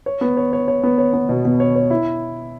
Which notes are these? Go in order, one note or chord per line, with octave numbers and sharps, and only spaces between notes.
C#5
B3
C#5
C#5
C#5
B3
C#5
B3
B2
B2
C#5
C#5
E4